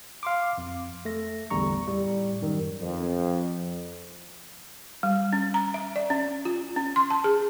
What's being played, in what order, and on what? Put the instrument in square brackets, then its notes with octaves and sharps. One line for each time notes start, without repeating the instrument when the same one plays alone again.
[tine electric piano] F5 C6 D6
F2
A3 A#6
A1 E2 D3 G3 A#5 C#6
A2 G3
F#2 D#3 G3
[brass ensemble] F2
[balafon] G3
C#4
A#5
E5
D5
C#4
F4
C#4
C6
A5
G#4